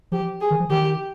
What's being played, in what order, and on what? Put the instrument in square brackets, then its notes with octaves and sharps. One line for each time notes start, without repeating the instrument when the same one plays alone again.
[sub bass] F3 [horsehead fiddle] G4
[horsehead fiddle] G#4
[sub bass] D#3
F3
[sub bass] D#3 [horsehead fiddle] G4